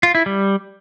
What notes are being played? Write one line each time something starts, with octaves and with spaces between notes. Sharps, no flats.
F4
E4
G3